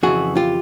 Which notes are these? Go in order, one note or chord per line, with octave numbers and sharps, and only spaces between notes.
F2 C#3 E3 F#4 G#4
F4 G4